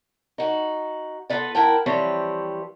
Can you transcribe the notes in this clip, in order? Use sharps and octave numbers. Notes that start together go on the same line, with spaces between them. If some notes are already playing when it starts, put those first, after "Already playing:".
D#4 F#4
B3 F4 A4 B4 D5
E4 A#4 F#5 G5 A5
E3 F3 G3 C4 B4 C#5